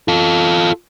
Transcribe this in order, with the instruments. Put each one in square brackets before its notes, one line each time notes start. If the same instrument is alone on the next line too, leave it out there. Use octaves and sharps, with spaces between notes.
[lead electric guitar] F4 A4